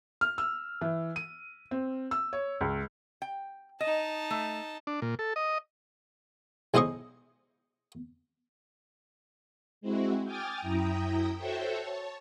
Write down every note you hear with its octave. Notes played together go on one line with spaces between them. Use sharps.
F6
E6
E3
D#7
C4
E6
C#5
C#2
G5
D#4 D#5 A5
A3
D4
A#2
A4
D#5
B1 G#3 E4 C5 D#5 C#6
G#3 C4 E4 F#4
G5 G#5 D6 D#6 F6 A6
F#2 E4 G5 A#5 D#6
F#4 A4 C5 C#5 E5 G5
C#5 A5